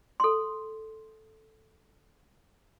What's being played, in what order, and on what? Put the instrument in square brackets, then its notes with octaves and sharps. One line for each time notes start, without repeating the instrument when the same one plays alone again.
[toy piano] A4 C6